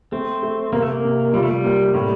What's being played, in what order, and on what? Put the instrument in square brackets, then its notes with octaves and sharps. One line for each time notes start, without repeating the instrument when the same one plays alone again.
[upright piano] A3 [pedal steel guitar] C4
[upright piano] A3
[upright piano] C3 [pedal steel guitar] A#3
[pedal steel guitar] A3
A#3
[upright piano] C3
[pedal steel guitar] G3 [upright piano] F4
[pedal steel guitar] A3
G3
[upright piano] A#3
[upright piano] A2 [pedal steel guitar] G3